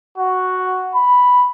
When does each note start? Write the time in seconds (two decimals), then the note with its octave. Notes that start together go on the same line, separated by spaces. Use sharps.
0.18 F#4
0.95 B5